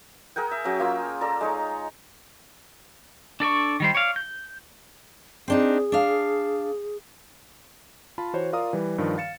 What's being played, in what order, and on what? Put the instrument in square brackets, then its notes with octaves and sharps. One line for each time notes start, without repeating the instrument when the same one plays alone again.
[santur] G#4 A#4 F#5 G5
E5
F#3 C#4 G#4 G5
A#3 F4 E6
A4 D5 A#5
G#3 D#4 C#5
[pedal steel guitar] D4 A4 D5 C#6
D#3 G3 C5
C#5 D5 F5
G6
[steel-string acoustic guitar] C4 D4 D#4 [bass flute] G#4
[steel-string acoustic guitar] D4 F5
[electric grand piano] F4 A5 B5
E3 F#4 C5 C#5
F4 A#4 D5 F5 A#5 D#6
E3 G3 B4
G2 D#3 F3
F5 A6 C#7 E7